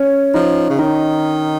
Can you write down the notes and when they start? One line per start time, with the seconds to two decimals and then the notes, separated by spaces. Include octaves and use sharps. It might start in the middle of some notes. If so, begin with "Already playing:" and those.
Already playing: C#4
0.34 F3 D#4
0.70 C#3
0.79 D#3 D#4